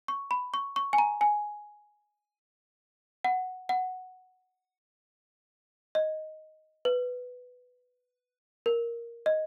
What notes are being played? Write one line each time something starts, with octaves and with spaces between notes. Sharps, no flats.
C#6
B5
C#6
C#6
G#5
A#5
G#5
F#5
F#5
D#5
B4
A#4
D#5